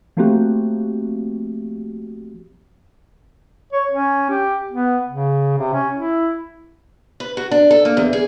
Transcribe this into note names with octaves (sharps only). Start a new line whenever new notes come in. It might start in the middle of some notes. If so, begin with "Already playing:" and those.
F3 A3 A#3 C4 F#4 G4
C#5
C#4
G4
B3
C#3
C3
C#4
E4
B4
F#4
D4
A4
A#3
E2
G#4